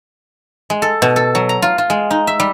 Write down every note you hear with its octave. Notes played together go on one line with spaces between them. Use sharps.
G#3
A4
B2
A4
F#3
A#5
F4
F4
G#3
D#4
E5
G3